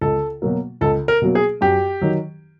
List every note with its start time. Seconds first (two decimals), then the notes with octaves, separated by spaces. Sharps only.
0.01 C#2 A4
0.42 B2 F#3 A#3
0.81 C#2 A4
1.08 A#4
1.22 B2 F#3 A#3
1.35 G#4
1.61 F#2 G4
2.01 D#3 F#3